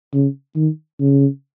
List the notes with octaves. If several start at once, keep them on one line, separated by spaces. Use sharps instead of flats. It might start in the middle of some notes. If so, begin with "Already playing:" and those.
C#3
D#3
C#3